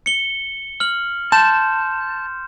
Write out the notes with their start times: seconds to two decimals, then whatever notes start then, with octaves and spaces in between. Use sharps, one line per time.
0.06 C#7 G7
0.80 F6 F#7
1.32 A5 C6 G6 E7